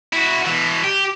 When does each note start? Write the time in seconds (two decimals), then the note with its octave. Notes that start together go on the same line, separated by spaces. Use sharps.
0.13 E4 F#4
0.45 B2 E3
0.84 G4